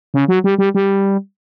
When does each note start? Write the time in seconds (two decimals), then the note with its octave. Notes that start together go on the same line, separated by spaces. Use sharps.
0.14 C#3
0.28 F#3
0.44 G3
0.58 G3
0.75 G3